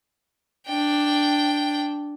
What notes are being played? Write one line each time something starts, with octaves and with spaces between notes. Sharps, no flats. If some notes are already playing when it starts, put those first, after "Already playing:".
D4 G5